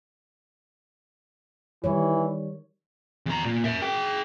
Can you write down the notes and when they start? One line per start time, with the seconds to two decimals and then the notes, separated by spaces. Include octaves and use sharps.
1.84 D#3 E3 G3 C#5
3.26 E2 A#5
3.44 A#2
3.64 A#4 E5
3.82 G#4 G5